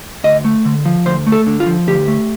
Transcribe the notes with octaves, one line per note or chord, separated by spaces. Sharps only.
D2 D#5
A3
D3
F3
D2 C5
A3
A4
D3
F4
F3
D2 G4
A3